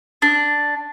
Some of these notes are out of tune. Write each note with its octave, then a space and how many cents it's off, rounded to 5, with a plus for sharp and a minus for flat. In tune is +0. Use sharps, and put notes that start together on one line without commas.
D4 +0